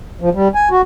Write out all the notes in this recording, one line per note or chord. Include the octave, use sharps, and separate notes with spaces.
F3
G3
G#5
F#4